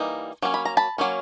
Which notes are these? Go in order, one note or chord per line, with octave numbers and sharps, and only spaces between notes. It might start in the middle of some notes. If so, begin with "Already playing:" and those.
Already playing: E3 G3 A#3 D#4
F#3 A#3 C#4
B5
A#5
A5 B5
F#3 A#3 C#4